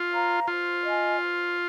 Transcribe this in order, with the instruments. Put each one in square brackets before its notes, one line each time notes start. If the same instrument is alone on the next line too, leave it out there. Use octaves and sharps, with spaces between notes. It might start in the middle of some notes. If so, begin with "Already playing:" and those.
Already playing: [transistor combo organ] F4
[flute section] C5 F5 A#5
[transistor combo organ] F4 [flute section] C5
[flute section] D#5 G#5
C5